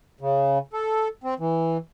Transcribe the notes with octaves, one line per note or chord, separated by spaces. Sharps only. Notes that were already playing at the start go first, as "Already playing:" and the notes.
C#3
A4
C4
E3